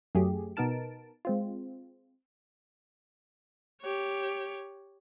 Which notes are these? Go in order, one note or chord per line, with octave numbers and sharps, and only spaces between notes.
F#2 F#3 A3 G4 G#4
B2 B3 D#4 A#4 A5 D7
G#3 C4 F4
G4 C#5